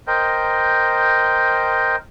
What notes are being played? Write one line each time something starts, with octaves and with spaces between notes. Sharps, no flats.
A#4 C5 D#5 G5